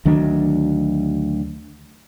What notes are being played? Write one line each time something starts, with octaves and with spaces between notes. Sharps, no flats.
D2 D#3 F#3 D4